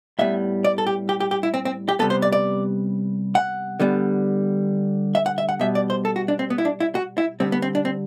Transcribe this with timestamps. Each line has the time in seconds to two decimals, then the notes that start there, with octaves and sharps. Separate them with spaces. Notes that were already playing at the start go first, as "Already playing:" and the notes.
0.19 A2 G3 B3 E5
0.64 D5
0.78 A4
0.87 G4
1.09 G4
1.20 G4
1.31 G4
1.43 E4
1.54 C4
1.65 C4
1.89 G4
1.99 C3 G3 B3 A4
2.10 C5
2.22 D5
2.32 D5
3.35 F#5
3.80 D3 G3 B3
5.15 E5
5.26 F#5
5.38 E5
5.49 F#5
5.59 B2 G3 B3 E5
5.75 D5
5.90 C5
6.05 A4
6.16 F#4
6.28 D4
6.39 C4
6.50 B3
6.58 E4
6.65 D4
6.80 E4
6.95 F#4
7.18 E4
7.40 D3 G3 B3 C4
7.52 B3
7.62 C4
7.75 D4
7.85 C4